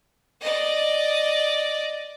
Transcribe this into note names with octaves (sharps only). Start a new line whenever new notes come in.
D5 D#5